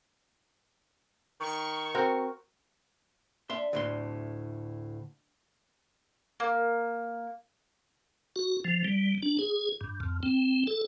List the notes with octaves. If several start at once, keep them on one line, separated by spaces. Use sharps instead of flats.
D#3 C#6
C4 F#4 A#4
D4 E5 C6
D2 A2 C6
A#3
F#4
F3
G3
D4
G#4
G2
F2
C4
A4